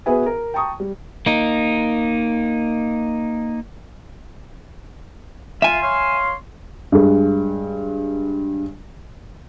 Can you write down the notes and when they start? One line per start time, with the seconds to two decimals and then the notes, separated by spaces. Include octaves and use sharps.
0.06 B3 F#4 G#4 B4 E5 G#5
0.26 A#4
0.54 G5 A5 A#5 C#6 D#6
0.80 G3
1.26 A#3 D#4
5.62 F4 E5 G#5
5.82 C#5 F5 C6
6.92 G2 G#3